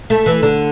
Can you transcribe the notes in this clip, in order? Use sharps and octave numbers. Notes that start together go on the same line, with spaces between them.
A3
E3
D3